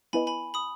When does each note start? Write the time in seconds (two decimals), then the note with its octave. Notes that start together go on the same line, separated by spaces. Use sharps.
0.13 B3 E4 B4 D#5 G#5 B5
0.27 G#5 B5
0.54 B5 D#6